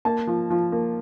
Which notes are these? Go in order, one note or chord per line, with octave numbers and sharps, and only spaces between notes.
A#3 A5
F3
F3
A#3